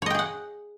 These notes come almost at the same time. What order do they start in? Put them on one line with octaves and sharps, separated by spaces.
C#5 D#5 G5 G#4 F#5